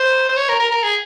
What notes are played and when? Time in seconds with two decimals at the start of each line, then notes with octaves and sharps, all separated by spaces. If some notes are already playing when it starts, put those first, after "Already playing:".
Already playing: C5
0.29 C5
0.36 C#5
0.49 A#4
0.60 A#4
0.71 A#4
0.83 G#4